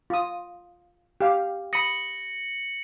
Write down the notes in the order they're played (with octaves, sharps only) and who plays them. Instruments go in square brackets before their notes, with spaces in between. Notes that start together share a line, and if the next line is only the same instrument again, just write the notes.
[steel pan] F4 D#6
G4 F5
[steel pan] B5 D#6 [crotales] A#6 C#7 F#7